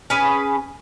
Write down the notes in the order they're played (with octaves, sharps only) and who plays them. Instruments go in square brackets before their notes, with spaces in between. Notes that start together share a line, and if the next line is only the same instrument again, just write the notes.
[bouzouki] C#4 G#4 B4 G#5